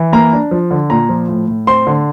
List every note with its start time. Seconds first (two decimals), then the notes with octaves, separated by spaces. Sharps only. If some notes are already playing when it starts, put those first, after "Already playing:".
Already playing: E3
0.13 A#3 A#5
0.33 D4
0.51 F3
0.71 D3
0.90 A#2 A#5
1.09 F3
1.28 A2
1.48 A2
1.67 C4 C6
1.87 D3